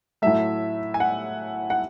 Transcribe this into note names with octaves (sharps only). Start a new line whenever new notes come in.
A2 F#3 A3 E5
G#5
F#5
F#5